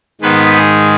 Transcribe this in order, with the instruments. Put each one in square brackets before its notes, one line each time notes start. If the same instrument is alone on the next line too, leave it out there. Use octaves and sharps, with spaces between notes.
[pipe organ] G#2 D#3 G#3 B3 B4
G#4